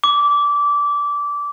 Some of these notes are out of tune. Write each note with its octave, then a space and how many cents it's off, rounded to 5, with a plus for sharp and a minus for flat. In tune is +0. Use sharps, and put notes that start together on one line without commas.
D6 -20